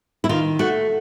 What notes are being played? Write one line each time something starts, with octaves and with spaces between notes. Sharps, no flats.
E4
D#3 F4
A3 F#4